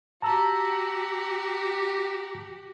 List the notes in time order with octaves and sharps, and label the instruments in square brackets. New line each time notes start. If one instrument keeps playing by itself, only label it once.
[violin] F#4 G4 [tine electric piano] A5 A#5 E6